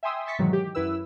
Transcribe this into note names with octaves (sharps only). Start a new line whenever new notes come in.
E5 G5 G#5 C6 D#6 E6
E5 C6 C#6 A6 B6 C#7
G#2 B2 D#3 E3 F#3 G#3
G4
F#2 E4 B4 E6